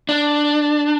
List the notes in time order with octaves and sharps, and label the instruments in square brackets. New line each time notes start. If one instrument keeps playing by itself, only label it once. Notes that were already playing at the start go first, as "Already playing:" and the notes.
[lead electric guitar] D4